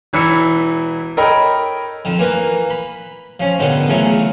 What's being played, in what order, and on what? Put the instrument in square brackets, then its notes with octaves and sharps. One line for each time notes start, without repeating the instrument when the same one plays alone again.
[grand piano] E1 E3 E4 B5 E6 C#7
A4 A#4 C#5 D#5 G5 B5
[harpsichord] F2 D#3
E3 A#3 A#4 B4
B5
F3 C#4
G#2 B2 D3 D#3 B3
E2 C#3 F#3 A3 F4